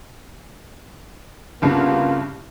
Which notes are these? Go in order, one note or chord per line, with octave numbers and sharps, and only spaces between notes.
C2 G2 C#3 A#3 B3 F4